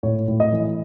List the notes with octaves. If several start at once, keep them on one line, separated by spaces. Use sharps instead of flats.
A2 C#5
A2
D#5
E3